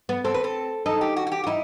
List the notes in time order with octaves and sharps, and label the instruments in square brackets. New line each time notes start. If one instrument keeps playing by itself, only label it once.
[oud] B3
[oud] C4 [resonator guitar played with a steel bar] A4
[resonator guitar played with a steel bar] B4
A4
[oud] D#4 [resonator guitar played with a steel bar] A4
[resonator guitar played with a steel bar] G4
F#4
F#4
G4
F#4
[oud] D#4 [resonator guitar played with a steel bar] E4